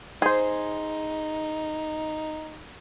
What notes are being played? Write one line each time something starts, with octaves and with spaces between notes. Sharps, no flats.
D#4 G#4 C5